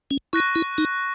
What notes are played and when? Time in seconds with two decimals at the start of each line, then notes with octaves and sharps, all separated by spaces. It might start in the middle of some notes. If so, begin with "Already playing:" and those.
0.11 C#4
0.33 E4 C#6 F#6 A#6 D#7
0.56 E4
0.78 D#4